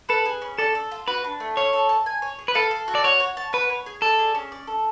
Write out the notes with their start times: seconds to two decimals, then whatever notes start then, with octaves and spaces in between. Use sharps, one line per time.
0.09 A4 B4
0.26 G#4
0.42 C#4
0.58 A4 D5
0.75 A4
0.91 F4
1.08 F#4 B4
1.24 D4
1.40 A3
1.57 C#5 F5
1.73 A4
1.89 A5
2.06 G#5
2.22 C#5
2.39 G#4
2.48 B4
2.55 A4 F5
2.71 A4
2.88 F#4
2.95 D5
3.04 C#5 F#5
3.20 C#5
3.37 A5
3.53 B4 F#5
3.69 C#5
3.86 G#4
4.02 A4 D5
4.19 G#4
4.35 C#4
4.52 D5
4.67 A4